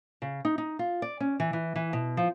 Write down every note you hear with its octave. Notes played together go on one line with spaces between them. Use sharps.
C#3
D#4
D#4
F4
D5
C#4
E3
E3
E3
B2
F3